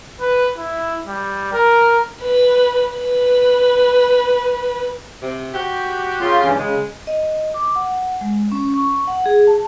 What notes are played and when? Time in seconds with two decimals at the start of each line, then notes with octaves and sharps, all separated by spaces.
0.20 B4
0.57 E4
1.07 G3
1.53 A#4
2.22 B4
2.92 B4
5.22 C3
5.55 F#4 G4
6.21 C#3 F4 C6
6.45 G2 E3 C#4
6.58 C#3 G#3
7.07 D#5
7.54 D6
7.76 F#5
8.21 G#3
8.52 C#4
8.74 C#6
9.07 F#5
9.26 G#4
9.47 A5